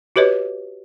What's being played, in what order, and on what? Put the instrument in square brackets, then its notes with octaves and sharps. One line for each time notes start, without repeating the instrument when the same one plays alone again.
[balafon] F#4 G4 B4 C#5 D#5